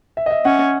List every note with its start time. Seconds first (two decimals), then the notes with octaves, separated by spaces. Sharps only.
0.17 E5
0.26 D#5
0.31 E5
0.45 C#4 F#5